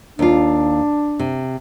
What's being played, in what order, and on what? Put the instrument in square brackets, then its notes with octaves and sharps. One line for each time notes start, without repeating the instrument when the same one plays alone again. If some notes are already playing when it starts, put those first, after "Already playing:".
[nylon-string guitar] D#2 F4 [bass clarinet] D4
[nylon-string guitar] C3